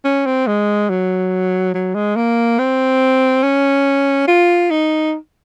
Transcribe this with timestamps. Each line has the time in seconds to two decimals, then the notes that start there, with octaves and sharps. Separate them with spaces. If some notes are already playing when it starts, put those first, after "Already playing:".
0.05 C#4
0.26 C4
0.47 G#3
0.89 F#3
1.74 F#3
1.95 G#3
2.16 A#3
2.59 C4
3.43 C#4
4.27 F4
4.70 D#4